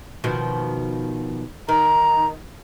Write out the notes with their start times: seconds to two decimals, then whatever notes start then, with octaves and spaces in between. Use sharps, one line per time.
0.24 B2 D#3 F3
1.69 D#3 A#5